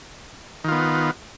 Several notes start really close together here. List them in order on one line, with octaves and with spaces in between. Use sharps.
D#3 F4 B3